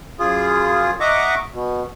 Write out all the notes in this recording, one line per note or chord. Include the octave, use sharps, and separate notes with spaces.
F#2 F4 G#4
D#5 E5 F#5 A#5 C#6 D6
B2